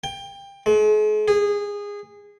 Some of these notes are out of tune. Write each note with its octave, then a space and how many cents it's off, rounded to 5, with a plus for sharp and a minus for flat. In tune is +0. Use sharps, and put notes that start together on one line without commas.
G5 +20
G#3 +45
G#4 -20